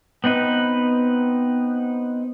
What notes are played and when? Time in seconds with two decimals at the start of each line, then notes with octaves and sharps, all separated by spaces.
0.24 B3 C4 D#4 B4